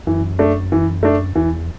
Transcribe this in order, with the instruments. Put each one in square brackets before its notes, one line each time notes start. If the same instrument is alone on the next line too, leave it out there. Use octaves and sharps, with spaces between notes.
[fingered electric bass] F#2 [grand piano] E3
[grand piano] A3 D4
E3
A3 D4
[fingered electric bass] E2 [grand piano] E3